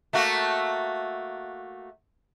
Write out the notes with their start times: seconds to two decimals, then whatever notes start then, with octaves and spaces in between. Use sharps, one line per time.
0.13 A3 A#3 F#4